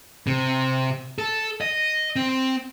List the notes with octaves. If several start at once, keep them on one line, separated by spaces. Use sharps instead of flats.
C3
A4
D#5
C4